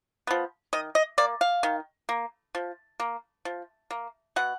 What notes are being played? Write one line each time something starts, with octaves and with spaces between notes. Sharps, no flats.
F3 B3
D#3 D#5
D#5
A#3 D5
F5
D#3
A#3
F3
A#3
F3
A#3
B2 F#5